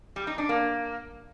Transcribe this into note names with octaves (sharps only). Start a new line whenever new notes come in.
G3
D#4
D4
A#3